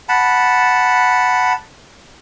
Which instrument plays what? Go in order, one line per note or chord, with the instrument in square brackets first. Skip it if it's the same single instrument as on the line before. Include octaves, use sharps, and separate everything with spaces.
[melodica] F#5 A5 B5